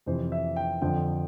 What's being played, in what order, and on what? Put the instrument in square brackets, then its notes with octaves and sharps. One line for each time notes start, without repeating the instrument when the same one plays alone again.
[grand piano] F2 C3 E3 C5
E5
G5
F2 D3 F3 G5